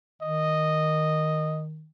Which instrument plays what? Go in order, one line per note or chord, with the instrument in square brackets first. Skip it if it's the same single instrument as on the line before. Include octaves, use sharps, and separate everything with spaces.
[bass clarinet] D#3 [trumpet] D#5